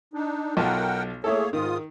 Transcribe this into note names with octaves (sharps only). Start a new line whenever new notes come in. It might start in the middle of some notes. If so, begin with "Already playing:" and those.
D4 D#4
B1 F4 A#4 F#5 G5 A5
A3 A#3 E4 G#4 A4 C#5
G#2 D#3 F4 D#6